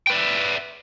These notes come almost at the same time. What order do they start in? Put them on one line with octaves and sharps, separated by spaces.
G5 B4 D5 E5